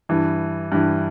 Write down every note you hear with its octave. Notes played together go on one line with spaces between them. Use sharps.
G2 E3
G2 E3